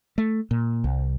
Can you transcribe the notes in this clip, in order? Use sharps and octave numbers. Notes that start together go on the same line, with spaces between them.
A3
A#2
C2